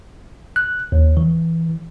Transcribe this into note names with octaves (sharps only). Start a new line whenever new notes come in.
F#6
D#2
E3